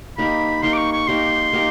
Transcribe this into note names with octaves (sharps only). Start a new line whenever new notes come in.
A#3 D#4 G4 A#4 B5
A#3 D#4 G4 A#4 C6
D6
C#6
C#6
A#3 D#4 G4 A#4 C6
A#3 D#4 G4 A#4